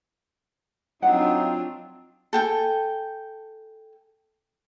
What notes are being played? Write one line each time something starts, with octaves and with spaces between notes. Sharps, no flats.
F#3 C4 D4 D#4 F4 F#5
A4 G5 G#5